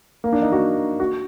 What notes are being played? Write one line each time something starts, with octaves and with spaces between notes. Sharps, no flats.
A#3
D4
D#4
F#4
F#4